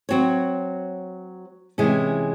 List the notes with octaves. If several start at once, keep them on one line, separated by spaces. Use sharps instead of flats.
F#3 C4 F#4 C#5
C3 E3 G#3 C#4 G#4